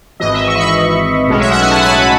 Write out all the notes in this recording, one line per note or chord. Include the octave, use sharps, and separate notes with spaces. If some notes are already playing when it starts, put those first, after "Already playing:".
G#1 G#2 E3 D#5
E5
C#6
B5
C#6
C#6
B1 A2 G#3 C#4
E5
F#5
G#5
A5
B5